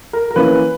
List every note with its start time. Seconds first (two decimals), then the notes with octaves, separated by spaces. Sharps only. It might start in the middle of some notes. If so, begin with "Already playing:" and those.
0.13 A#4
0.31 A#4
0.36 E3 A#3 C#4 B4